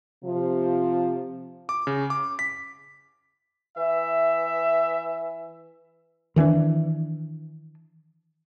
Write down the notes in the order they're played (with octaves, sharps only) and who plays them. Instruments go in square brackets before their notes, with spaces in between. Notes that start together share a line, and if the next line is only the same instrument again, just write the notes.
[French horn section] C3 F3
[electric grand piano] D6
C#3
D6
B6
[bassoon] E3 [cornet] E5
[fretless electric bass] D#3 E3 C4 D4